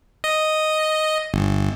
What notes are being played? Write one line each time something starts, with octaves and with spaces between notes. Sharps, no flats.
D#5
G1